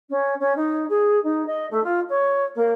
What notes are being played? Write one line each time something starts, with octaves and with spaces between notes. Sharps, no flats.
C#4
C#4
D#4
G#4
D#4
D#5
A3
F4
C#5
A#3